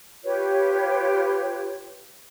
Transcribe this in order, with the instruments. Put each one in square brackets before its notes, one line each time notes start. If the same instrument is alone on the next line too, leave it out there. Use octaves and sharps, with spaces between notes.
[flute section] F4 G4 B4 C#5